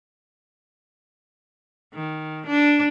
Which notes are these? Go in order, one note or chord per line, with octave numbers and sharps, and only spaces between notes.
D#3
D4